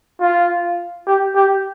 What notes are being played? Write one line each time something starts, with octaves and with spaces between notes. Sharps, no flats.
F4
G4
G4